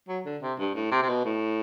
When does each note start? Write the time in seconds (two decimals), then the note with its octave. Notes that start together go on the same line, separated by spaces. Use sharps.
0.08 F#3
0.25 D3
0.42 C3
0.59 G2
0.75 A2
0.91 C3
1.02 C3
1.09 B2
1.25 A2